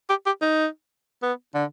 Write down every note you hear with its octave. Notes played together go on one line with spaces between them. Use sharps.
G4
G4
D#4
B3
D3